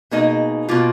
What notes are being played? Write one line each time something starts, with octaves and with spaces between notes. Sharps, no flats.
B2 A#3 D#4 G#4 D#5
B2 A#3 F4